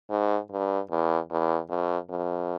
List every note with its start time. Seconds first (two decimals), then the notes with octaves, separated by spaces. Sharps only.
0.10 G#2
0.51 G2
0.91 E2
1.31 E2
1.70 F2
2.11 F2